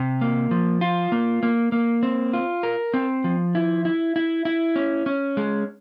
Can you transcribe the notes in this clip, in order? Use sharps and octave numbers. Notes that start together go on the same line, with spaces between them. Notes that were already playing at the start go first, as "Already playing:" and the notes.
Already playing: C3
A#3
F3
F4
A#3
A#3
A#3
C4
F4
A#4
C4
F3
E4
E4
E4
E4
C#4
C#4
G#3